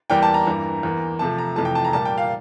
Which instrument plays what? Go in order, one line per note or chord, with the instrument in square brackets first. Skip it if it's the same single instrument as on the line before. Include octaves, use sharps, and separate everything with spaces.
[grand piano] E2 E3 G3 A#3 G5
A5
A#5
G2 E3 A#3
E2 E3 A#3
C3 F3 A3 A5
A#5
F2 C3 E3 A3 A5
G5
A5
A#5
A#2 G3 A#3 A5
G5
F5